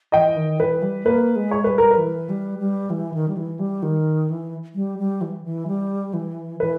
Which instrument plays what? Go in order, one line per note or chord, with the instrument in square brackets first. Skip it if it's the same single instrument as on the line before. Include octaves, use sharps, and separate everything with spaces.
[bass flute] E3 [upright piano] D#5 G5
[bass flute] D#3
[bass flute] E3 [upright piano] B4
[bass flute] G3
[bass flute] A#3 [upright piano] B4
[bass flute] G#3
[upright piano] C#5
[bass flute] G3 [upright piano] B4
[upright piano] A#4
B4
[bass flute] E3
G3
G3
E3
D#3
G3
E3
G3
D#3
E3
G3
G3
E3
E3
G3
E3
[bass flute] E3 [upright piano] B4